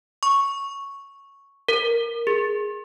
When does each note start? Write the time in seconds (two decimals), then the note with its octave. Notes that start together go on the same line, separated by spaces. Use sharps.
0.23 C#6
1.69 A#4
2.27 G#4